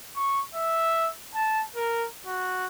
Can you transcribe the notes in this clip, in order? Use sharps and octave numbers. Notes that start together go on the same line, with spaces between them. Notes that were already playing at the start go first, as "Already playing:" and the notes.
C#6
E5
A5
A#4
F#4